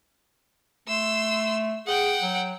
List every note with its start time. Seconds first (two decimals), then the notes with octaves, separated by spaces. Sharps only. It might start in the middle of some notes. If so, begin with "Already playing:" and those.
0.88 A3 C6 E6
1.87 G#4 F#5 G5
2.22 F#3